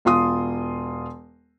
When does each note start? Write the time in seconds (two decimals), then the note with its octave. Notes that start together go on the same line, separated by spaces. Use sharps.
0.05 E1 F4 C6 D#6